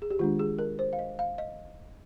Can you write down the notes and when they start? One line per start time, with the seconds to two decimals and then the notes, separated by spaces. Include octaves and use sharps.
0.02 G#4
0.11 G4
0.19 D#3 G#3 D4 F4
0.39 G#4
0.59 A#4
0.79 C5
0.93 F5
0.99 D#5
1.19 F5
1.38 D#5